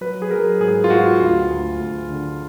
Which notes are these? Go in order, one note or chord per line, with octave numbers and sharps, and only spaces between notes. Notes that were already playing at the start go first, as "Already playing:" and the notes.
F#3 B4
G#4
F#3 A#4
G#2 G#4
F4
G#2 F#4
D2 F4
D2
D2
D3